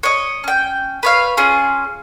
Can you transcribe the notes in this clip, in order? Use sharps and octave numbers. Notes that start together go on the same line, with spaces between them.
C#5 D#5
C#4 G5
B4 C#5 F5
C#4 F4 G#4